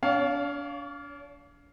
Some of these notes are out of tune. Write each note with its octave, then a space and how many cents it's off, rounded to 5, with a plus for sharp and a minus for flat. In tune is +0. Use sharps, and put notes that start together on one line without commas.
D4 -40 C#5 +25 F5 +0